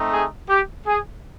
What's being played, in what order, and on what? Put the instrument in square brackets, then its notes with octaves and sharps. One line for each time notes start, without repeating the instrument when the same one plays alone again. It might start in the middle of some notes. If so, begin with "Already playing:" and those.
Already playing: [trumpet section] A3 C4 D#4
G#4
G4
G#4